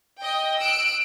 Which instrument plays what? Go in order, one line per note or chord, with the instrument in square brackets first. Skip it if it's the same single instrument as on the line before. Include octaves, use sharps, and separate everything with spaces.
[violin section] D#5 G5
E6 F#6 D7